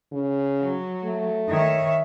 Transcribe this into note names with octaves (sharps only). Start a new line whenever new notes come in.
C#3
F#3
A3
D#3 C#5 E5